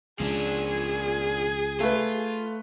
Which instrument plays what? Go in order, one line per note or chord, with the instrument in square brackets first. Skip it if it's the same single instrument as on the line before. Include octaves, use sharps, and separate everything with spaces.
[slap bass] C#2 [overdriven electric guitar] F3 D4 [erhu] G#4
[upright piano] A3 B4 [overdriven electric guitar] F4